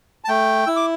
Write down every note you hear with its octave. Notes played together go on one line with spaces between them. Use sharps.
A5
A3 G5
E4 E6
D6